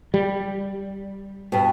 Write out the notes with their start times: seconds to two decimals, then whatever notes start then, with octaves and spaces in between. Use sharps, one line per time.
0.14 G3
1.52 G2 B2